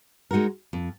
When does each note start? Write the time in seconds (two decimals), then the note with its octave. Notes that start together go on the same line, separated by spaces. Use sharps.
0.31 G#3 D#4 F#4 A#4
0.73 F2